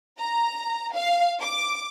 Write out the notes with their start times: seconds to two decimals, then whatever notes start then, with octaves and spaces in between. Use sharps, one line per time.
0.18 A#5
0.93 F5
1.41 D6